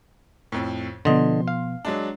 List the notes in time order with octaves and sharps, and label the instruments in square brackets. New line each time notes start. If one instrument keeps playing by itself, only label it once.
[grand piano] F2 A2
[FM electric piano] B2 F3 B3 [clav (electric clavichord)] D3 D#5 [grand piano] C6
[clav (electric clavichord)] F5
[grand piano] F#3 G#3 D4